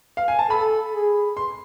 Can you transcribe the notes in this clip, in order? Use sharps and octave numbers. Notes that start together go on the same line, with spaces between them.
F5
G#5
A5
A4 B5
G#4
C6